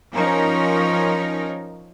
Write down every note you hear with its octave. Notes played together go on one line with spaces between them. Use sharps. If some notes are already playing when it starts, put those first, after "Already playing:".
F3 C#4 D#4 A#4 C#5